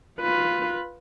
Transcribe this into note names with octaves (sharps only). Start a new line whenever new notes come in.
F4 B4